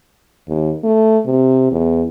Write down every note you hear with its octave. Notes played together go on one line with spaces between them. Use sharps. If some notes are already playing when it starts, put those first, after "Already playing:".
D#2
A3
C3
E2